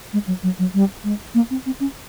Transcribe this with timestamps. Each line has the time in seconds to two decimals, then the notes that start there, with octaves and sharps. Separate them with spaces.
0.13 G#3
0.27 F#3
0.43 F#3
0.59 F#3
0.74 G3
1.04 G#3
1.34 A#3
1.50 C4
1.66 C4
1.80 C#4